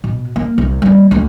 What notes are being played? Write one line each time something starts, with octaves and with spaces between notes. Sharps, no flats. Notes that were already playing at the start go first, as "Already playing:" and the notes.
B2
A#3
C2
G3 A#3
D2